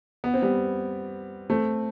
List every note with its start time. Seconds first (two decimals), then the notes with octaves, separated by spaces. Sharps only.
0.24 B3
0.34 C4
0.42 G3 B3
1.50 A3 C4